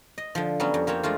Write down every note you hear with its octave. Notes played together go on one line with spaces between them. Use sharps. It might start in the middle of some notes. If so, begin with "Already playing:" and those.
D#5
D3 F3
F#3 G3 B3 C#4
F2
A#3 C4 G4 C#5
G#3 A3 D4 F4